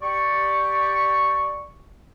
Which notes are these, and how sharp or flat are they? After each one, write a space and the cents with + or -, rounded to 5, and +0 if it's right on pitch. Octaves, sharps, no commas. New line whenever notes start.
G4 +0 D5 +0 C#6 +0